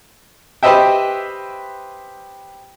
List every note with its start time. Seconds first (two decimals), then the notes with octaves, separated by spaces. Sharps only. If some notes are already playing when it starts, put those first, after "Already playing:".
0.63 G4 B4 C5 D#5 E5 G5